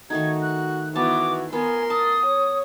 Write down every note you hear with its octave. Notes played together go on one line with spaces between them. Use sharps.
D#3 A3 D#4 F#4 G#6
F#6
E3 B3 F#4 A5 D6
B3 F4 A#4 G#5 C6
A5 D#6
C#5